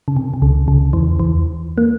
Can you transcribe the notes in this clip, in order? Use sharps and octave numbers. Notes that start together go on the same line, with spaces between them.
C#3
C3
C3
C#2 C#3
C#2 C#3
E2 E3
E2 E3
A#3